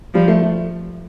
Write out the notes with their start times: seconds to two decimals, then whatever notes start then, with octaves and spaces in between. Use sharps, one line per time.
0.14 F3 G3
0.28 A3
0.42 A3